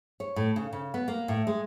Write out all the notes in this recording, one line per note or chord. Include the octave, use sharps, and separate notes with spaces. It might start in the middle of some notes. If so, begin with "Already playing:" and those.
C#5
A2
C#3
C#3
B3
A#3
A2
G#3